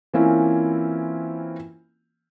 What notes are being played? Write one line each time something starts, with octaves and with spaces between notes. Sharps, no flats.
E3 A#3 C4 C#4 E4 F4